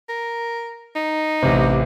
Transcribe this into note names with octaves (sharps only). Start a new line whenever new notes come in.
A#4
D#4
A1 C3